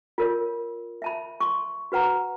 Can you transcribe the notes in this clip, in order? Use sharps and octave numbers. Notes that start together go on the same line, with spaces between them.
F4 A#4 C#5
E5 A5 B5
C6 C#6
F#4 B4 F#5 A#5